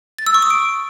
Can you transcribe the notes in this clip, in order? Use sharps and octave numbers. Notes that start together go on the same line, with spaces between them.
A6
E6
C#6
D#6
D7